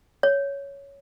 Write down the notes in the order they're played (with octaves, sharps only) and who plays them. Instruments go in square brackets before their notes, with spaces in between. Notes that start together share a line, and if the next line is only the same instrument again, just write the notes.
[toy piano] C#5